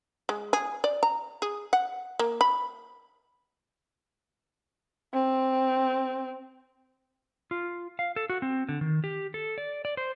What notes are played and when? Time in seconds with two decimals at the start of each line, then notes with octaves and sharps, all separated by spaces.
0.29 G#3
0.53 G#4
0.84 D5
1.03 A#5
1.42 G#4
1.73 F#5
2.19 A#3
2.41 B5
5.14 C4
7.51 F4
7.99 F5
8.16 A4
8.30 F#4
8.42 C4
8.69 D3
8.81 D#3
9.04 G4
9.34 A4
9.58 D5
9.85 D5
9.97 C5